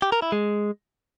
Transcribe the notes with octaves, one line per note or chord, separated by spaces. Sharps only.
G4
A#4
E4
G#3